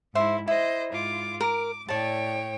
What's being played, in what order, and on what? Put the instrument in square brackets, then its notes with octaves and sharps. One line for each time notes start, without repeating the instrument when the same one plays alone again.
[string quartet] G#2 E4 [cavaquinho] C5 E5
[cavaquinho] E4 [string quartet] C5 D#5
[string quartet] G#2 F4 D6
[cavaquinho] A#4 [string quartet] D6
[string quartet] A2 C#5 G5 [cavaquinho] D5 A5